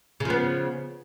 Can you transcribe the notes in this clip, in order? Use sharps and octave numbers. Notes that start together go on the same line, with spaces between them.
C#3 F3 B3